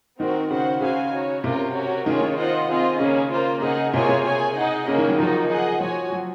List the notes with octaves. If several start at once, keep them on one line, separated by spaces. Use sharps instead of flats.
D#3 C4 F#4 A#4
C#3 F#4 C5 F#5
C#3 F#4 C5 F5 G#5
D#4 F#4 C#5
C3 C#4 F4 A#4
C#4 F#4 A#4 C#5
D#3 A#3 C#4 F4 G#4 C#5
D#3
F4 C5 D#5 F#5
C4 F4 G#4 D#5
C#3 A#3 C#4 G#4
A#3 F4 C5
C#3 D#4 G#4 D#5 F#5
C3 A#3 F4 G#4 C#5 G#5
C3
G#4 C#5 G#5
D#4 G#4 D#5 F#5
C#3 A#3 C#4 G#4
D#3
F#3
F3 A#3 D#4 F#4 A#4
G#4 D#5 F#5
F3 F#4 C#5 G#5
F#3